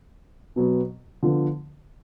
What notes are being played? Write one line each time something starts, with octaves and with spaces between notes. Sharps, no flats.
B2 F#3 B3
D3 F3 B3